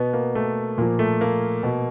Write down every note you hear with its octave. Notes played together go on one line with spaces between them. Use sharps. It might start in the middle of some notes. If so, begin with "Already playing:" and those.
Already playing: B2 B3
A#3
A3
A#2 F3 A#3
A3
A#3
B2